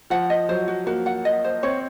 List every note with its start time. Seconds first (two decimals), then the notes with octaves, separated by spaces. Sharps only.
0.10 F3 F#5
0.30 D#5
0.49 F#3 C5
0.68 F#4
0.87 A#3 F#4
1.06 F#5
1.25 D#5
1.44 C5
1.63 C4 C#5